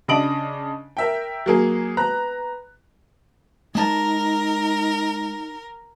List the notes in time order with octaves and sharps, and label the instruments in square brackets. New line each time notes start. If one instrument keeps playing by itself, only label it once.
[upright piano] C#3 D4 D#5 D#6 D7 F#7
A#4 E5 G5
F#3 A#3 G#4
B3 A#5 F#6
[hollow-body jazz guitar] G#3 A5 [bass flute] D#4 [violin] A#4